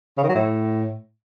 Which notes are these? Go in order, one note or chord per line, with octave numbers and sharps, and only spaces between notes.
C#3
D#3
F#3
A2